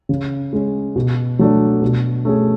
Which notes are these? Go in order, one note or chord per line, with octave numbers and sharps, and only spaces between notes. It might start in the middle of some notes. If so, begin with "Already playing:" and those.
C#3
G#3 C#4
B2
F#3 A3 D4
B2
A3 C#4 G#4